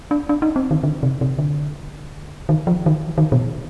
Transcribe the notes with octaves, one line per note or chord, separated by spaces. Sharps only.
D4
D4
D#4
C4
D#3
D3
C3
C3
D3
D#3
F3
D#3
D#3
B2